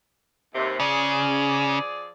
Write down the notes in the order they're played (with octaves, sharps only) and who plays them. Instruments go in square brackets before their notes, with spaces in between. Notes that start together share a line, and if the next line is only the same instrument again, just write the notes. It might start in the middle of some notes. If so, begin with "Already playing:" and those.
[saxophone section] D#2 C3
[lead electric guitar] C#3 [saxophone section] F3 G#4 D5